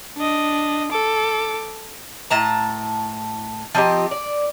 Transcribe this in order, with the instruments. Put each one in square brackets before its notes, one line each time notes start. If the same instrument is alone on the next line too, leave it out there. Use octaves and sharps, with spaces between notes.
[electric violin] D4 D#5
A4 D6
[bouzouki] A2 A5 A#5
F3 C4 D#4 G4
D5